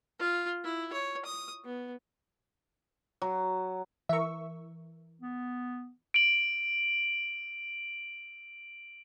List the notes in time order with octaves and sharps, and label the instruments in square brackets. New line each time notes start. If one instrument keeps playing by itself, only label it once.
[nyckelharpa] F4
E4
C#5
D#6
B3
[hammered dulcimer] F#3
[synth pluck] E3 A#4 [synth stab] E5 C#6
[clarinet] B3
[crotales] D7 F#7